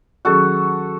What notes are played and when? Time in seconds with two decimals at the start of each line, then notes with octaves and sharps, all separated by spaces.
0.25 D#3 F#3 C#4 F#4 G#4 A4